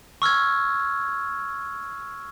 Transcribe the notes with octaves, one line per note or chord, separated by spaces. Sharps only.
C#6 E6 F6 G#6